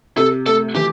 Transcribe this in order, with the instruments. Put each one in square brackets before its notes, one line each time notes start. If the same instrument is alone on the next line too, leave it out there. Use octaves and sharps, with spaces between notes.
[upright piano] C3 [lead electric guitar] A4
[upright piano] A3 [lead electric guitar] A4
[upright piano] E3 [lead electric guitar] G4